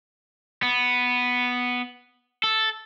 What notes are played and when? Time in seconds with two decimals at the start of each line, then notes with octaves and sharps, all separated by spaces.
0.63 B3
2.44 A4